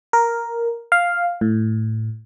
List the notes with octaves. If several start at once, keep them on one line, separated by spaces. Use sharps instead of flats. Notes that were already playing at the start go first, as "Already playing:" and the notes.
A#4
F5
A2